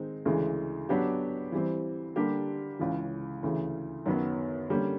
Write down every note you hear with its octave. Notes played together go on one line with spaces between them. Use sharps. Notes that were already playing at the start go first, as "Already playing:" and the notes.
Already playing: D#3 G#3 C4 D#4
D2 C#3 E3 G#3
F#3 B3 D4 G4
E3 G3 C4
D3 G3 A#3 D4 G4
C#2 C#3 E3
D2 C#3 E3
F#2 D#3 F#3 B3
D3 G3 A#3 C#4